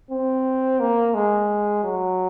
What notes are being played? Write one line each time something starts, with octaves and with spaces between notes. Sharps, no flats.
C4
A#3
G#3
F#3